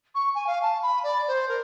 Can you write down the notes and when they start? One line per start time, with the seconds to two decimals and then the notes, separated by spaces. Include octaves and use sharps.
0.15 C#6
0.34 G#5
0.46 F5
0.62 A5
0.82 B5
1.03 D5
1.28 C5
1.48 A#4